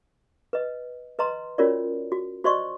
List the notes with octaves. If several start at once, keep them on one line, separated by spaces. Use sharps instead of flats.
B4 D#5
B4 D#5 A#5 C6
C#4 F4 F#4 A#4 C#5 D5
F#4
F#4 C5 D5 D#5 C6 C#6